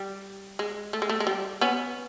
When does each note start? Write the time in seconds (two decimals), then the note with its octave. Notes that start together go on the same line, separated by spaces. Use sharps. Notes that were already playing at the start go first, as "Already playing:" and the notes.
Already playing: G3
0.59 G#3
0.93 A3
1.02 G#3
1.09 A3
1.20 G#3
1.27 G3
1.61 B3 C#4